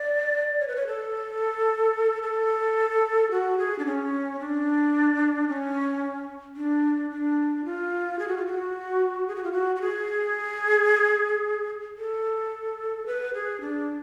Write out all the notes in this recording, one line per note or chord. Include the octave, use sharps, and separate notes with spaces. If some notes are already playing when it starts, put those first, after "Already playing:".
Already playing: D5
C#5
B4
C#5
A4
A4
F#4
G#4
D4
C#4
D4
C#4
D4
D4
F4
G#4
F#4
F4
F#4
G#4
F#4
F4
F#4
F#4
G#4
A4
B4
G#4
D4